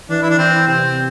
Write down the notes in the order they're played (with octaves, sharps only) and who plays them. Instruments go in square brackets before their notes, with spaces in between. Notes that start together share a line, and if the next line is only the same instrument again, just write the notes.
[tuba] E3 [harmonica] D4
[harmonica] E4
D4
[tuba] E3 [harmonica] C4
[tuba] C3 [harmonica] C4